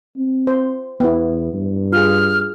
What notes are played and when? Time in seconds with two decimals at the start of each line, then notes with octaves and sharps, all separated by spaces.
0.17 C4
0.47 C5
1.00 E2 B3 E4
1.54 G2
1.92 F4 G#4 F6